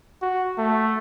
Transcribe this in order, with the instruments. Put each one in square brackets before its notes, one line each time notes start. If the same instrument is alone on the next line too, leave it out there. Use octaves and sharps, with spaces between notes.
[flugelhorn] F#4
A3